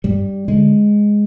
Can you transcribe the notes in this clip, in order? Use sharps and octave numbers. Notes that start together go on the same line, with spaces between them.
G2 G3
D3 G#3